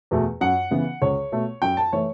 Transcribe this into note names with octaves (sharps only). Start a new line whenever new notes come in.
E2 B2 A3
F#2 F#5
C#3 E3 B3
C#2 C#5
B2 A3
F#2 G5
A5
E3 A3 C#5